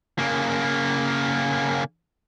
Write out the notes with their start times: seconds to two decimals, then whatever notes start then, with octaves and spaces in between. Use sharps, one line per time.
0.19 C#3 A#3